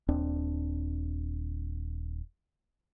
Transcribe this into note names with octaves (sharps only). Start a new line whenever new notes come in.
D#1 D#2 C4 D4